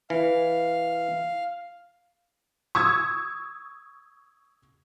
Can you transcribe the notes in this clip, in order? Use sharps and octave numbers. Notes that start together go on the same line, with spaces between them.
E3 F5
C#6 D#6 E6 G#6